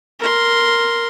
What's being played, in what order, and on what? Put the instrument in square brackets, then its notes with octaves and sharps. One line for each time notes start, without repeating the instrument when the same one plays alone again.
[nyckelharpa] A#4 C6